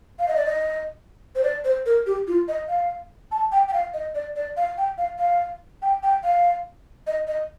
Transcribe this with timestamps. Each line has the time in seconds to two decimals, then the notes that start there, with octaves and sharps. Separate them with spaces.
0.19 F5
0.28 D#5
0.36 D5
0.46 D#5
1.35 C5
1.43 D5
1.65 C5
1.86 A#4
2.06 G4
2.28 F4
2.48 D#5
2.69 F5
3.32 A5
3.52 G5
3.68 G5
3.73 F5
3.94 D#5
4.15 D5
4.36 D5
4.57 F5
4.78 G5
4.98 F5
5.19 F5
5.82 G5
6.03 G5
6.24 F5
7.07 D#5
7.27 D#5